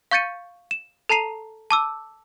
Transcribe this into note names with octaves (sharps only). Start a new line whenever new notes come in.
F5 C#6 G6 A6 C#7 D#7
E7
A4 A5 A#5 C7 D#7 F7
A5 D6 E6